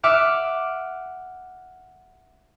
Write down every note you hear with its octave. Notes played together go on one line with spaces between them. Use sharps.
E5 F#5 D6 F6